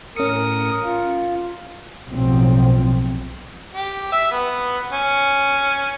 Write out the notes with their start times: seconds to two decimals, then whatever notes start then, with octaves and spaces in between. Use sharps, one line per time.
0.16 A2 C#4 A#4 D#6 C#7
0.84 F4
2.11 B1 A2 F3 C4
3.73 G4
4.12 E5
4.31 B3
4.93 C#4